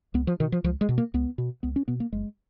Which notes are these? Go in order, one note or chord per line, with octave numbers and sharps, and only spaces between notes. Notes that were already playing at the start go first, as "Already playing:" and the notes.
C#2 B3
F3
B2 D#3
F3
C#2 F3
G#3
B2
A#3
C#2 B3
B2
C#2 B3
C#4
B2 B3
A#3
F#1 G#3